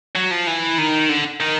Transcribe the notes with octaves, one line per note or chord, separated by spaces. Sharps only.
F#3
F3
E3
D#3
D3
D#3